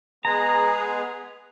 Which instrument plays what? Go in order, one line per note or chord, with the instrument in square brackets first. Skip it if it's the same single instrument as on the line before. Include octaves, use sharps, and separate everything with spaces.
[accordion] G#3 B3 G#4 [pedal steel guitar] A#5